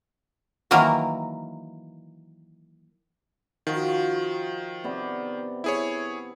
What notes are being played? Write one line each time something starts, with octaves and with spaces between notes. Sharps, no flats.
D#3 E3 F#3 A#3 A#4
D#3 F3 F#4
C3 B3 D5
E4 G#4 C#5